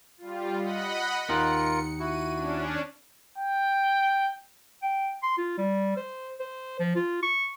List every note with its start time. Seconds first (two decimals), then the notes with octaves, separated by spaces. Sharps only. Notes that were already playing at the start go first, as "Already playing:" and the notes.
0.18 G3 F4
0.58 D#5 F#5 B5
1.29 D#2 D#4 F4 A#4 F#5 C#7
1.99 E4 F#4 D#7
2.33 C#4 D4
3.38 G5
4.82 G5
5.23 C6
5.38 F4
5.58 G3
5.97 C5
6.40 C5
6.80 F3
6.96 F4
7.23 C#6